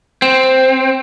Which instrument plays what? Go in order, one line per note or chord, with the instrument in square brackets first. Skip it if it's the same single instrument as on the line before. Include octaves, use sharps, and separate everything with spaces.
[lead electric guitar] C4